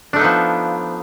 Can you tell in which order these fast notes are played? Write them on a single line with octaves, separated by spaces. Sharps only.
D4 A3 D#4 B3 F3